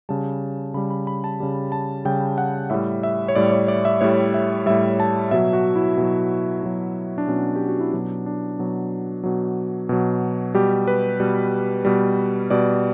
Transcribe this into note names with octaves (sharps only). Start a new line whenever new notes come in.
C#3 G3 A5
C#3 G3 B5
B5
B5
A5
C#3 G3
A5
C#3 G3 G5
F#5
A2 G3 E5
E5
C#5
A2 G3 D5
C#5
D5
E5
A2 G3 C#5
E5
A2 G3 E5
A5
B2 F#3 E5
F#4
E4
B2 F#3
B2 F#3
D4
B2 F#3 C#4
G4
F#4
E4
B2 F#3 D4
D4
B2 F#3
B2 F#3
B2 F#3
B2 G3 G4
B4
B2 G3
B2 G3
B2 G3 D5